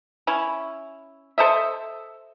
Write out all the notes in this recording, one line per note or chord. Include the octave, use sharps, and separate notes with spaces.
C#4 E4
A4 C5 D#5 E5